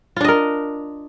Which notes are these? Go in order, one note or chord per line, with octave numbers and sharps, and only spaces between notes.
D4 F4 A#4 D#5